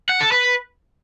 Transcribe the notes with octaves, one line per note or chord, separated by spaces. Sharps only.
F#5
A4
B4